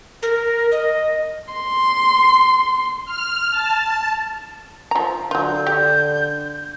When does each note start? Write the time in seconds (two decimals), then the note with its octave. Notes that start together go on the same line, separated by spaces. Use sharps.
0.23 A#4
0.72 D#5
1.53 C6
3.05 F6
3.51 A5
4.91 F3 A#5
5.31 D3 F#3 F4 G6
5.66 G4 D5